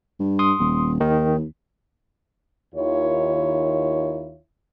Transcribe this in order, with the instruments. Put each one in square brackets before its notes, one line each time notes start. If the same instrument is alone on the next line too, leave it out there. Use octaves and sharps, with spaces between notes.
[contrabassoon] G2
[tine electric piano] C6 D#6
[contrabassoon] D#1
[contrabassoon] D#2 [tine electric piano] D#3
[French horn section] D#2 D#3 E4 F4 C#5